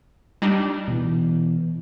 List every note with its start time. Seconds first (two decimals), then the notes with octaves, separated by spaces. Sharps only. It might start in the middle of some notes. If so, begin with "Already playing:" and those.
0.42 G3 D4 D#4
0.88 B2 E3